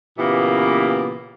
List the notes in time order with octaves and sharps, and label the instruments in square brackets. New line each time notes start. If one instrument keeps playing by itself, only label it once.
[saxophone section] A#2 C#3 E3 A#3 B3 G4